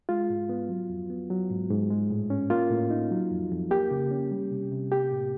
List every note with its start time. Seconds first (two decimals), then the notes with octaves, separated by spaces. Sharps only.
0.09 G#3 F4
0.30 G#2
0.49 B3
0.69 F#3
0.89 F2
1.10 B3
1.30 F#3
1.50 G#2
1.70 G#2
1.91 G#3
2.10 A2
2.30 C#4
2.50 A#3 F4
2.70 A2
2.90 D#4
3.11 F#3
3.31 F2
3.51 F2
3.71 A#3 G4
3.91 C#3
4.11 C#4
4.31 G3
4.51 C3
4.71 C3
4.92 A#3 G4
5.11 A2